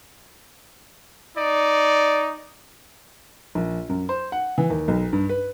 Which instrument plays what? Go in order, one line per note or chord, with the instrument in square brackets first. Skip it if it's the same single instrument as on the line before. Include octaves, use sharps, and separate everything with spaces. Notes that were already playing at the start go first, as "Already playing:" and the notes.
[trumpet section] D#4 D5
[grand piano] A#1
F#2
C5
F#5
E3
D#2
B1
G2
B4